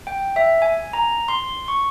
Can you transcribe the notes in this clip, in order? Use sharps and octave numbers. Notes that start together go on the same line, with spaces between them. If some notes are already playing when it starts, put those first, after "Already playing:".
G5
E5
G#5
A#5
C6
C#6